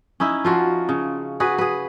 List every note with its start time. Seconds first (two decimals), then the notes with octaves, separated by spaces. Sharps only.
0.20 C#4 D#4 E4
0.45 F3 F4 F#4
0.89 C#3
1.40 F#4 G#4 B4
1.58 G#4 B4